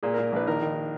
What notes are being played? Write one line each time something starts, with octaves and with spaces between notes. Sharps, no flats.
A#2 G#4
A#4
A#2
A#1 B4
D#3 A#4
D#3